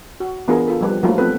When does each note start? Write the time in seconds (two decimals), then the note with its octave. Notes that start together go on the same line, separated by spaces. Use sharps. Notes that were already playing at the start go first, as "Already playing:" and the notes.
0.20 F#4
0.48 E3 B3 D4 F4 G#4 A#4
0.68 F4 A4
0.81 F3 G3 B4
1.03 F3 F#3 A3 A#3 D#4 F4
1.18 B3 C4 A4 B4